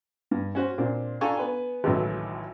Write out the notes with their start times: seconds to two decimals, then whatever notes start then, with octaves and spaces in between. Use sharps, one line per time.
0.31 G2
0.55 C#4 F#4 C5
0.78 A#2 C4 D4
1.21 D4 F4 A4 G#5 A#5 C#6
1.37 B3 B4 G#5
1.84 G#1 C#2 A2 E3 F#3